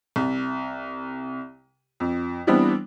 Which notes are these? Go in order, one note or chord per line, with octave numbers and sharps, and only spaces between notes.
C2
F2
E3 G3 B3 C4 D4